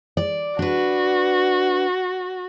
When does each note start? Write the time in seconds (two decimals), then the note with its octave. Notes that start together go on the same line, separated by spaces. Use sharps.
0.17 D5
0.59 D4 F#4 B4